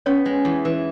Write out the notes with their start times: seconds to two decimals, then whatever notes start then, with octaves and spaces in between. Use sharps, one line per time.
0.06 B3 C#4 C#5
0.25 G#3
0.45 E2
0.65 E3